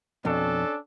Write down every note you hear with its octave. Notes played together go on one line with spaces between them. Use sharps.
F2 B2 C#4 D4 A4